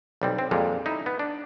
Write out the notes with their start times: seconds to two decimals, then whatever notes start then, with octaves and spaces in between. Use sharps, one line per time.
0.22 B1 G3 C4
0.39 C4
0.51 F2 A#2 G3 G#3
0.86 D#4 E4
1.06 B3
1.19 D4